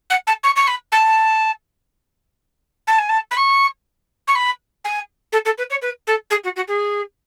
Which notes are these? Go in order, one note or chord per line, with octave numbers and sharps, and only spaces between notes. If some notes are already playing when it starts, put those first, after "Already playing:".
F#5
A5
C#6
C#6
B5
A5
A5
G#5
A5
B5
C#6
C#6
B5
G#5
A4
A4
B4
C#5
B4
A4
G#4
F#4
F#4
G#4